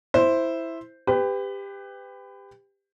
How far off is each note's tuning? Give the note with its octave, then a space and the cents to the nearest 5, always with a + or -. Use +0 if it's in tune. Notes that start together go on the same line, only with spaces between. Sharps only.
E4 +0 C5 +0
G4 +20 B4 +30